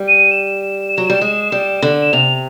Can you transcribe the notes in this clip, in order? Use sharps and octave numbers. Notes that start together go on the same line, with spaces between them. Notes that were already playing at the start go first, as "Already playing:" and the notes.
Already playing: G3
D#7
E7
F#3
G3
G#3
G3
D3
E7
C3 F7